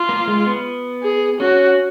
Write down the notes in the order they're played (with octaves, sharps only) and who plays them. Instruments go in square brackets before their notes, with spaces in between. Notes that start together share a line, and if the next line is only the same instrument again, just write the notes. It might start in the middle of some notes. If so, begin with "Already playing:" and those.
Already playing: [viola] F4
[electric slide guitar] A#3
G#3
B3
[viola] G#4
[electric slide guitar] C#4 [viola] F#4